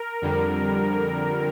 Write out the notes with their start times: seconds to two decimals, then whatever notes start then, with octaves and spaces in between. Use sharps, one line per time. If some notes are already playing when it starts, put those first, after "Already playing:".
Already playing: A#4
0.22 F2 D3 G3